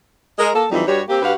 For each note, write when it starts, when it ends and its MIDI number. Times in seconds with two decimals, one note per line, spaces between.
0.39 0.52 56
0.39 0.52 70
0.54 0.66 58
0.54 0.66 69
0.71 0.84 41
0.71 0.84 52
0.71 0.84 54
0.71 0.84 55
0.71 0.84 63
0.87 1.02 43
0.87 1.02 55
0.87 1.02 66
0.87 1.02 73
1.09 1.21 58
1.09 1.21 60
1.09 1.21 67
1.22 1.34 43
1.22 1.34 66
1.22 1.34 67
1.22 1.34 71
1.22 1.34 77